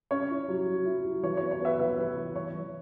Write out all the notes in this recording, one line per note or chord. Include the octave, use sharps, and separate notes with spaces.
C#4 C#5
E4
F#3
F#3
E4
F#3
E3 C#5
B3 C#5
C#5
B3 B4 E5
E3 B4 E5
E3 B4
E3
E3 C#5
E3